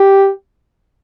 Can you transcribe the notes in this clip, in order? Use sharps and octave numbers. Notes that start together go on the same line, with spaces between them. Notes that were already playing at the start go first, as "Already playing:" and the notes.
Already playing: G4